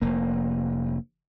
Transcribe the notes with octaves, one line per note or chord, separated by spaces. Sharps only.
F1 A#3